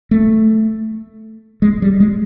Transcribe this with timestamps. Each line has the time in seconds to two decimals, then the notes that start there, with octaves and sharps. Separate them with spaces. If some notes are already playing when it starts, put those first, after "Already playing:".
0.11 A3
1.62 G#3
1.82 G3
2.00 G#3